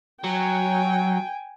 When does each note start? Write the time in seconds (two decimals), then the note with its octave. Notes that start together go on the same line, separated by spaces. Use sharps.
0.24 F#3 G5 G#5